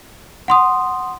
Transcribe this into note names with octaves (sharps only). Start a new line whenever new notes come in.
F#5 C6 D#6